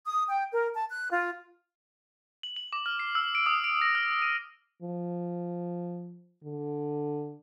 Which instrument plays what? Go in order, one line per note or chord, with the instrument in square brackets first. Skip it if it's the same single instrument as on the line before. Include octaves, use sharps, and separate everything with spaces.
[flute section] D#6
G5
A#4
A5
F#6
F4
[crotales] F#7
F#7
D6
F6
C7
E6
D7
D#6
D7
A#6
F6
D#7
[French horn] F3
D3